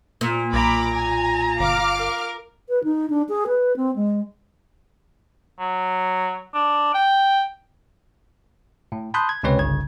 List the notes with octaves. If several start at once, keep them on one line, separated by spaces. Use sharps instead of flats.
A#2
B1 A#4 A#5 B5 D6
G#5
G1 F5 D6 F6
A#4
B4
D#4
D4
G#4
B4
C4
G#3
F#3
D4
G5
A2
A5 B5 C6 D#6 F#6 G6
G#6
C#2 C3 C4 C#4 B4 C#5
G1 C2 C#3 G#6